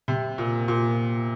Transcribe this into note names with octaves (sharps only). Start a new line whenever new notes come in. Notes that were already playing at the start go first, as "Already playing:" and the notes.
C3
A#2
A#2